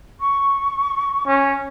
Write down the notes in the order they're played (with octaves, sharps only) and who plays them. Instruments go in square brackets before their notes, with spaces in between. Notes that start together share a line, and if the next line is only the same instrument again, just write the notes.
[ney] C#6
[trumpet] C#4